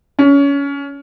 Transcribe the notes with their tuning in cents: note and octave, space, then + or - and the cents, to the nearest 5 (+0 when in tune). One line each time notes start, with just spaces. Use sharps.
C#4 +25